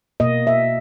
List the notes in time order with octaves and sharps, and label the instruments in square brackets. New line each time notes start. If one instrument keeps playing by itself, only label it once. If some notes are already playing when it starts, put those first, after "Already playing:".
[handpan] B2 A#3 D#5
E5